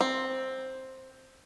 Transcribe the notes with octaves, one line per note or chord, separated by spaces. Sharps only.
C4